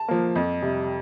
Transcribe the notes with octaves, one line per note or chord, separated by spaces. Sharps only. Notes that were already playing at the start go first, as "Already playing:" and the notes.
Already playing: A5
F3 A#3
F2
C3 G3